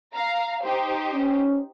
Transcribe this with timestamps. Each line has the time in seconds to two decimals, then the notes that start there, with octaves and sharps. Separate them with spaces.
0.15 F5 A#5
0.64 D#4 G4 C5
1.12 C#4